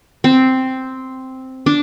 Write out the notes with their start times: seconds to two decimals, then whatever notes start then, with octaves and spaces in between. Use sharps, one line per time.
0.24 C4
1.66 D4